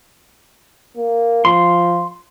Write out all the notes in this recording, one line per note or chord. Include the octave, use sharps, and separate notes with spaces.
A#3
F3 C6